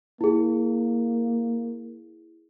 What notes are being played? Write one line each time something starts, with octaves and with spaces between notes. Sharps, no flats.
A#3 E4 G#4